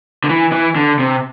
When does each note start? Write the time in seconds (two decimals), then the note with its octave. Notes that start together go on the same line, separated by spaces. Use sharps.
0.24 D3
0.29 E3
0.52 E3
0.76 D3
0.99 C3